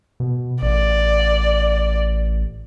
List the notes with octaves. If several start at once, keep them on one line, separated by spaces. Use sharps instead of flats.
B2
A1 D5